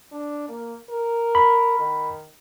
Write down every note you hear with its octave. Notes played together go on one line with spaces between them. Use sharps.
D4
A#3
A#4
B5
D#3